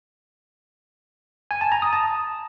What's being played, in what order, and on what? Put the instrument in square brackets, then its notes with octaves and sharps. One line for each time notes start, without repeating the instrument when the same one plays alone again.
[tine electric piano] G#5
A5
A#5
D#6
A5